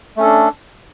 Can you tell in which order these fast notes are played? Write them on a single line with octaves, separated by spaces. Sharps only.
A3 C#4 A4 D4